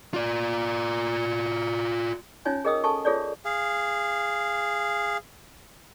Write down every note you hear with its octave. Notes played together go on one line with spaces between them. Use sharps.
F4 D5
C#4 D#4 F4 C#5 G#5
G#4 A#4 D#5 G5 D#6 E6
A4 G#5 A5 C#6
F4 G#4 A4 C#5 D5
G#4 F5